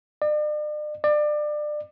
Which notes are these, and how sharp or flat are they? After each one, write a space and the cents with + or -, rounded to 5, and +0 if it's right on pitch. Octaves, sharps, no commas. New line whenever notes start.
D5 +40
D5 +25